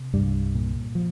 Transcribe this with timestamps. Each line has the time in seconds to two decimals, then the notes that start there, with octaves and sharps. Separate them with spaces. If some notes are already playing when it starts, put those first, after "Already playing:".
Already playing: C3
0.14 C2 G2 G3
0.55 A#2
0.95 F3